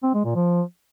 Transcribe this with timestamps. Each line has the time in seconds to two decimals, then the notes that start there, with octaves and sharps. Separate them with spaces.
0.03 C4
0.14 G#3
0.25 A#2
0.35 F3